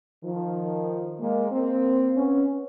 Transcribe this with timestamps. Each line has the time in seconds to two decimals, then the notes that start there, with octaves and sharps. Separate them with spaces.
0.24 D#3 F3
1.20 G#3 A#3
1.51 A#3 C4
2.16 B3 C#4